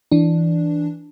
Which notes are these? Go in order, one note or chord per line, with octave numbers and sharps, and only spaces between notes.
E3 D4